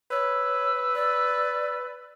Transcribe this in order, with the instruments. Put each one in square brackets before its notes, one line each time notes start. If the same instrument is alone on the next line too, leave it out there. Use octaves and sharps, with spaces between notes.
[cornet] B4 [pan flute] C#5 [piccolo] E6
[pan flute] D5